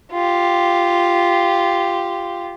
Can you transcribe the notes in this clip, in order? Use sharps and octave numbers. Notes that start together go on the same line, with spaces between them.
F4 G4